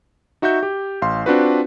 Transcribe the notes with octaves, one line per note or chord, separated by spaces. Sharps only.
D#4 F#4 E5 C#6 G6
G4
A1 F5 C6
C4 D4 F4 F#4 B4